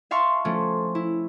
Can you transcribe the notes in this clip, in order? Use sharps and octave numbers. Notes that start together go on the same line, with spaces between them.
E5 F5 A5 C6 C#6
F3 A3 C#4 F4
E4